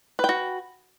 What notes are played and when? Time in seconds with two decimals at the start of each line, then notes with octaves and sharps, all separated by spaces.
0.19 B4
0.24 G5
0.29 F#4